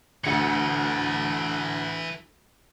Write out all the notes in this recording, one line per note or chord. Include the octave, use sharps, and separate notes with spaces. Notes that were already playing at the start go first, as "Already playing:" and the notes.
D2 E3 A4 C#7